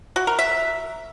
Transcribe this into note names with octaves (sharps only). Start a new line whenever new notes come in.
F#4
A#4
E5